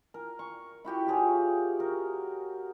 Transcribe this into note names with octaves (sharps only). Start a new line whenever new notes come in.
A#4
C#6
E4 F#4 G4 G5
F4 G4 G#4 C#5
F#4 A#4